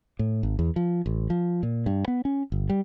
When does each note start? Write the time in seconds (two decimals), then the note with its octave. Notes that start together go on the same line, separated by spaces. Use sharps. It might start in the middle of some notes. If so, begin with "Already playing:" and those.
0.19 A2
0.43 G#1
0.59 E2
0.76 F3
1.06 A1
1.30 F3
1.63 A#2
1.86 G2
2.08 B3
2.25 C#4
2.52 G1
2.69 G3